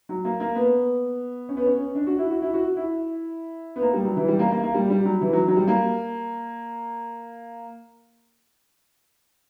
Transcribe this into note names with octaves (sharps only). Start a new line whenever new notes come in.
F#3
A#3
A#3
B3
C#4
B3
C#4
D4
F#4
E4
F#4
E4
F#4
E4
B3
A#3
G3
F#3
E3
G3
A#3
A#3
A#3
G3
G3
F#3
E3
F#3
F#3
G3
A#3